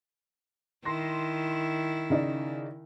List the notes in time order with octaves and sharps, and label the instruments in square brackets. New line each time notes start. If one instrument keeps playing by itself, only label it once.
[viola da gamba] D#3 E4 [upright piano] C6 A#6
[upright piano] C#3 D#4 D5